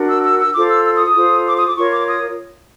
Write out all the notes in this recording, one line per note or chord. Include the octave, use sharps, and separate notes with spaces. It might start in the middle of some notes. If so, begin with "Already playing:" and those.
Already playing: D4 F#4 A#4
E6
E6
E6
F4 A4 C5 D6
E6
E6
D#6
D#6
F4 A4 C5
D6
D#6
D6
F4 A#4 C#5 C#6
D6
D#6